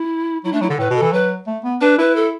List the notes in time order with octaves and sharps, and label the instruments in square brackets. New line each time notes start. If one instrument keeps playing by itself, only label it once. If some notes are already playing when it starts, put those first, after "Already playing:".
Already playing: [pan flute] E4
[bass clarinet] F#3 [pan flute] E4
[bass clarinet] A3 [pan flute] D4
[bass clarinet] F#3 [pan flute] E4
[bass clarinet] D3 [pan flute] A4
[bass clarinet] A2 [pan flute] B4
[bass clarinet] B2
[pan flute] A4
[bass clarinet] E3
[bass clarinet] F#3 [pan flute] B4
[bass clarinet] A3
B3
[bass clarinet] D4 [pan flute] B4
[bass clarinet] E4 [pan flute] B4
[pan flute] A4